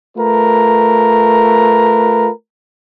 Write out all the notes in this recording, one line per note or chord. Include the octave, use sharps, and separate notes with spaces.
A3 F4 A#4 B4